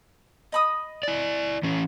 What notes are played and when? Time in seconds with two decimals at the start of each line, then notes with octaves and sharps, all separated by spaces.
0.52 D#5 B5 D#6
1.03 E4 D5
1.63 E3 C#4